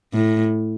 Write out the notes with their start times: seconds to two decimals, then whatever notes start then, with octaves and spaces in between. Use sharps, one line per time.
0.13 A2